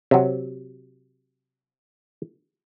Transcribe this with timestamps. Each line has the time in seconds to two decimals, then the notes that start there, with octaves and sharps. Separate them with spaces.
0.11 C3 F#3